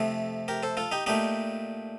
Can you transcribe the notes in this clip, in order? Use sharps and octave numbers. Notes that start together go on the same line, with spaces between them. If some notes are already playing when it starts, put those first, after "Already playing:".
Already playing: F2 C3 F3 A3
G4 A#4
A4 C5
F4 A4
D#4 G4
A#2 A3 D4 D#4 G4